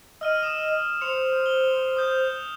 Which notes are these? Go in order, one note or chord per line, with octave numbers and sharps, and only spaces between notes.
D#5 E6 F6 D#7
D#6 E7
C5 C#7 F7
G7
D#6 G6